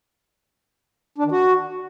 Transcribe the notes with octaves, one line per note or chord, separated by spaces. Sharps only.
D4
D#3
F#4